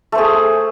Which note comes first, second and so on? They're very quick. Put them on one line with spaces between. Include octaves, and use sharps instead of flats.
A3 C5 G#4